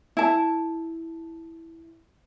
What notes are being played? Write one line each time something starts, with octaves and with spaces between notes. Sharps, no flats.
E4 A5